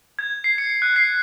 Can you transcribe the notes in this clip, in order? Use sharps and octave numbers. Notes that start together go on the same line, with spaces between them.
G#6
C7
C#7
F#6
C7